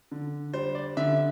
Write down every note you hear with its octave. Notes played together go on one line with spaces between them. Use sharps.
D3
G3 C5
D5
D3 E5